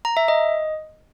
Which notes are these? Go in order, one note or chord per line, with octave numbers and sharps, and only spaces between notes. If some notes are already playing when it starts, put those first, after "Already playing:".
A#5
E5
D#5